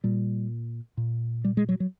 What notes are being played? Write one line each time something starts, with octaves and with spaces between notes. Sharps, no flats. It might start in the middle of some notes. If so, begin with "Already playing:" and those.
A#2 G3
A#2
G3
G#3
F#3
F#3